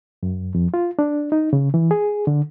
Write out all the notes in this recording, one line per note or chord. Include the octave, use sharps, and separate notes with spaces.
F#2
F2
F4
D4
D#4
C#3
E3
G#4
D3